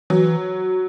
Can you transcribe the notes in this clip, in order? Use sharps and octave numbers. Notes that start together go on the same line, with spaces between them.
E3 F#3